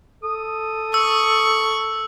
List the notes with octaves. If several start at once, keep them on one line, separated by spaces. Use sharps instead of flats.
A4 D#6
C#6 E6